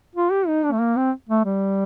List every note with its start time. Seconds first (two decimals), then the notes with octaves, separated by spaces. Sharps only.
0.15 F4
0.31 G4
0.48 D#4
0.64 D4
0.72 A3
0.80 A#3
0.97 C4
1.29 A3
1.45 G3